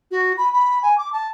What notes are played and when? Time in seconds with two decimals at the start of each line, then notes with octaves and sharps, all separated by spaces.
0.11 F#4
0.38 B5
0.53 B5
0.83 G#5
0.98 D6
1.13 A5